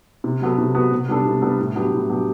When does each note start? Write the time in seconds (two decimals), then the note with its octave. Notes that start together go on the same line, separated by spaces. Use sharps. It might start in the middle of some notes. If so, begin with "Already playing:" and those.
0.24 C3
0.42 F#3 B3 F#4 A4
0.58 C3
0.75 F#3 B3 F#4 A4
0.92 C3
1.09 G3 B3 D4 A4
1.25 C3
1.42 G3 B3 D4 A4
1.58 A2
1.75 F#3 B3 D4 G4
1.93 A2
2.09 F#3 B3 D4 G4